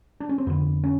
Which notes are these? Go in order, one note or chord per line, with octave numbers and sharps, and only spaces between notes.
D4
C#4
C4
F2 D3 B3
C#4